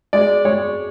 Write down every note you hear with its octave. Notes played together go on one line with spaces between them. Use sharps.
G#3 D5
G#3 C#5